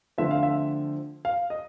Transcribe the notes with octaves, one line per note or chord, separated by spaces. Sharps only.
D3 F3 A3 C4 E5
F5
E5
F5
D#5